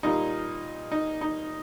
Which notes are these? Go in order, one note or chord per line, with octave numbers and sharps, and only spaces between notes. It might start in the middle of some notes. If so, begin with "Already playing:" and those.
A#2 G3 A#3 D#4
D#4
D#4